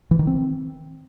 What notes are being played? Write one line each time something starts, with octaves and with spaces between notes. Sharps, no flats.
E3
D#3
C4